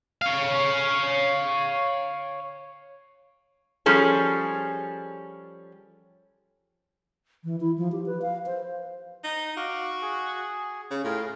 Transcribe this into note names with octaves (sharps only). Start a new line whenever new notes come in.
C#5 F5
F3 G3 C#4 G#4 A4
E3
E4
F3
G4
B4
F5
C5
D#4
F#4 F5 D6
G#4
C#3
A2 F4 G#4 A#4